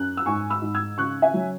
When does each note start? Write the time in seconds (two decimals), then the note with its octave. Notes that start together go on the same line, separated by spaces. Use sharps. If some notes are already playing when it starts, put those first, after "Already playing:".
Already playing: F#2 F#6
0.17 E6
0.26 G#2 G#5 C#6
0.50 B5 E6
0.62 G#2
0.75 E6 G#6
0.98 C#3 C#6 F#6
1.22 E5 G#5
1.34 F#3